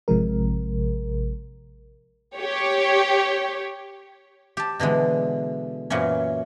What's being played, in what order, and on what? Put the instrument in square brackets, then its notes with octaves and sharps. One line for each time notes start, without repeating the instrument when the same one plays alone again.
[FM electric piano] A1 C3 F3 G#3 A#4
[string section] G4 C#5
[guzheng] G4 A5
B2 D3 E3 G#3
F#2 A#2 E3 F#3 C#4